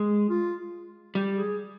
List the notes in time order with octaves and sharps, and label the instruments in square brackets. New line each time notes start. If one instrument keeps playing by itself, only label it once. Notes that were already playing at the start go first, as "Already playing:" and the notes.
Already playing: [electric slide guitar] G#3
[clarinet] F4
[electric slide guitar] G3 [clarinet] G4
[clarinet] G#4